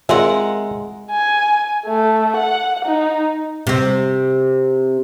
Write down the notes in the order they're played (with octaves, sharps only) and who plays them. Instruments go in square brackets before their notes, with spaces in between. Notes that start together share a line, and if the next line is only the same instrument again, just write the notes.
[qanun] G#3 A#4 F#5 [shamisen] C4 F4 D5 [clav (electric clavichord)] E5
[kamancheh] G#5
A3
F#5
D#4
[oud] C3 C4